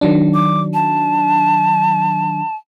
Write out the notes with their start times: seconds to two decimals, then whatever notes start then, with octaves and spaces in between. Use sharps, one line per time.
0.01 D#3 F#3 D4
0.34 D6
0.74 A5